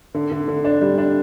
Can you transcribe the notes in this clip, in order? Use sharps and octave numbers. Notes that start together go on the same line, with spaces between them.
D3
D3
D3
D4
G3
D4